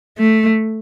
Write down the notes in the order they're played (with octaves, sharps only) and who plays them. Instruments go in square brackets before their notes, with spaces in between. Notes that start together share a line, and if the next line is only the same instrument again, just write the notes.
[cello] A3